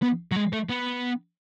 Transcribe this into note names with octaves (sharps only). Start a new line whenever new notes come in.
B3
F#3
G#3
A3
B3